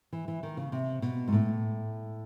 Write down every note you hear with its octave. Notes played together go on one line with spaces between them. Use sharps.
E3
E3
D#3
C#3
C3
B2
G#2
A2